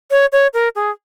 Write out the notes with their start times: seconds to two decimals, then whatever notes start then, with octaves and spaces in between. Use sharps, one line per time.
0.11 C#5
0.32 C#5
0.54 A#4
0.75 G#4